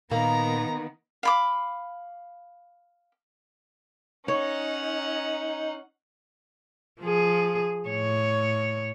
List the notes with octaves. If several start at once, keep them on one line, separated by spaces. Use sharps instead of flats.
A#2 D#3 A#3 B3 A#5
F5 B5 D6
C#4 D#4 C#5 F#5
F3 G#4
A2 C#5